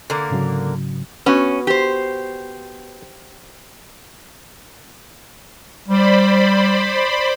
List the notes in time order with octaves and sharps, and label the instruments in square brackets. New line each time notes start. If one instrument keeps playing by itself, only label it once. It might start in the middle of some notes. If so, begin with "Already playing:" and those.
[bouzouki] D3 A#3 A#4
[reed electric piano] G#2 C#3 F#3
[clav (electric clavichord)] B3 F#4 [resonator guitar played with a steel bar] C#4
[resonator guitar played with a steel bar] G4 C5
[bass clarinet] G3 [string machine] C5 D5 B5